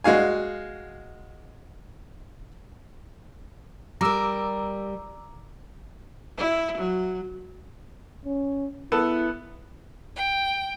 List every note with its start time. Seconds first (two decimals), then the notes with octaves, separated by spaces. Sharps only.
0.04 G#3 F#4 F5 G#5
4.01 G3 A#4 A#5 D6 E6
6.38 E4
6.78 F#3
8.26 C#4
8.92 B3 E4 A4 A5
10.16 G5